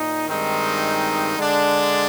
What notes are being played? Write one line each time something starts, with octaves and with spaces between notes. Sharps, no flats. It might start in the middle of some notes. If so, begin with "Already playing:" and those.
Already playing: A#2 D#4
G2 D#3 G#3 C4 D#4
D3 G#3 D4